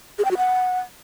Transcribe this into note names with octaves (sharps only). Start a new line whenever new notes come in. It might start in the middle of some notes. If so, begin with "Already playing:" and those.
G#4
G5
F#4
F#5